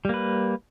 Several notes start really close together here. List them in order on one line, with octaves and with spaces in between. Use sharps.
G3 A#3 B4